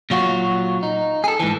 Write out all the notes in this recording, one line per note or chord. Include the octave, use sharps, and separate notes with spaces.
A#2 F#3 F4 F#4
D#4
G#4 A4
G#2 E3